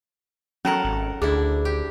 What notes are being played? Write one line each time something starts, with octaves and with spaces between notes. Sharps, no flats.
F#3 C#4 A4 A#4 F#5 A5 A#5
G#1
D2 D4 E4 G#4
G4